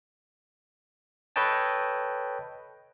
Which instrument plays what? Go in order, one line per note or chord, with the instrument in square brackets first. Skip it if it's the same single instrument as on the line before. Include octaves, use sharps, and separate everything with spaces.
[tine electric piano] A4 B4 C#5 D#5 G5 A5